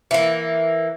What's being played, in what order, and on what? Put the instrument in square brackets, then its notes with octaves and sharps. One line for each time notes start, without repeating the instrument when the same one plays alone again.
[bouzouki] E3 A#3